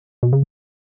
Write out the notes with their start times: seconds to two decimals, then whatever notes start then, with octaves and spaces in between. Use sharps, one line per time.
0.23 B2
0.33 C#3